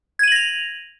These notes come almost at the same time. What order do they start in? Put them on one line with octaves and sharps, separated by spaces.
G#6 D#7 F#7 A#6 F7